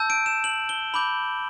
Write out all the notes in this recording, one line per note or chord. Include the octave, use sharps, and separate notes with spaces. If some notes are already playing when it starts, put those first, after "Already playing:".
Already playing: A5 E6 G6
D7
E7
F#7
G7
B5 D6 G6 F#7